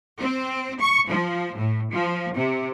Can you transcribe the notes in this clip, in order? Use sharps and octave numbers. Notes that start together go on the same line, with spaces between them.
C4
C#6
F3
A2
F3
C3